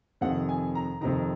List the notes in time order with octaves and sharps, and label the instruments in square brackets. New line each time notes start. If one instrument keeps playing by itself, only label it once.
[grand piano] F2 C3 D#3 F#5
G#5
A#5
F2 C3 D#3 A#5